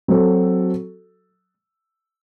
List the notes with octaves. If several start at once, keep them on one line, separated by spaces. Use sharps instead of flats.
F#3 C4 F#4 A4